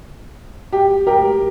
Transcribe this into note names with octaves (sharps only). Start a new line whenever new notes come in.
G4
G4 A#4